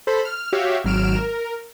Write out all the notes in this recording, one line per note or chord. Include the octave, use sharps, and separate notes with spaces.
A4 C5 B5
F6
F#4 G4 C#5 E5 F5
G#1 F#3 F6 D7 E7
A#4